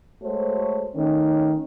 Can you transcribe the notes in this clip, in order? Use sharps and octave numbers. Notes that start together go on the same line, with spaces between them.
G#3 A3 F#4 A4 C5 C#5
D#3 A3 C#4